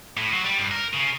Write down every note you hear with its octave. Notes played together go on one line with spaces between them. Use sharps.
A2
F#3
G3
G2
A#4
C#3